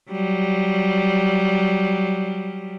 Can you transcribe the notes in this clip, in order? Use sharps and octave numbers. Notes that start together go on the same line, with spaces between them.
F#3 G3